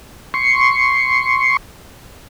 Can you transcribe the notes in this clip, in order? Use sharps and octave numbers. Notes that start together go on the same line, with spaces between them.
C6 C#6